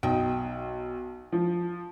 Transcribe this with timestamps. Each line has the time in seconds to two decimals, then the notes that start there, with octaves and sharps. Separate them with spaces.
0.03 B1 D#4 G5
1.32 F3